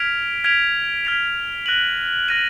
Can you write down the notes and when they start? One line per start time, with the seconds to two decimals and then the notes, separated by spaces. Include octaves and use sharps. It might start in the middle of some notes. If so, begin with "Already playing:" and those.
Already playing: F6 G#6 B6 D7 F7
0.44 F6 G#6 B6 D7 F7
1.05 F6 G#6 B6 D7 F7
1.66 F#6 A#6 D#7 F#7
2.28 F#6 A#6 D#7 F#7